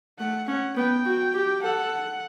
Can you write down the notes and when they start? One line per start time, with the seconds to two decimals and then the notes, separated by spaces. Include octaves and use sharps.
0.19 A3 F#5
0.48 C#4 F#5
0.76 B3 G5
1.05 F#4
1.34 G4
1.62 A4 F#5